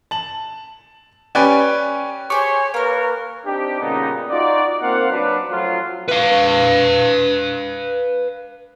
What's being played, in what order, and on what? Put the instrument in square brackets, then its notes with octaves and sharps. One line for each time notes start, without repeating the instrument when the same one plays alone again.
[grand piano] A5 F#7
C#4 G4 B4 D5 G5 G#5
[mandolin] G4 G#4 C5 [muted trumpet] C#5 [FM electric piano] C#6
[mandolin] A#3 F6 [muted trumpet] A#4 [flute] B4
[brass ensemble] C4 D4 D#4 G4
A#2 C#3 G3 B3 D#4
D#4 F4 F#4 D5
A#3 C4 F4 F5 F#5
F#3 D4 B4
F3 F#3 A3 C#4 F4
[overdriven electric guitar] B4 F5